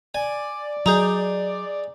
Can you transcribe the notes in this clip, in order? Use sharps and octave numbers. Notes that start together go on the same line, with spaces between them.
D5 G#5
F#3 D#4 G#4 A#5 D#6 G6